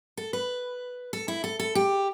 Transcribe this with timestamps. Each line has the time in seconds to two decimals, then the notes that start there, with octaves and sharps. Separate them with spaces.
0.17 A4
0.33 B4
1.13 A4
1.28 E4
1.44 A4
1.60 A4
1.75 G4